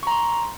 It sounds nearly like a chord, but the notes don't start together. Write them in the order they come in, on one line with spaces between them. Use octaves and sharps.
C#6 A#5 C6